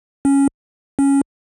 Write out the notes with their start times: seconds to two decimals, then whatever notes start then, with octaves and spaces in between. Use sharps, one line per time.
0.25 C#4
0.99 C#4